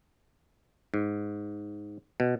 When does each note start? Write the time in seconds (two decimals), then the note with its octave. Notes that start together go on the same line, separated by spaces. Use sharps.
0.94 G#2
2.20 B2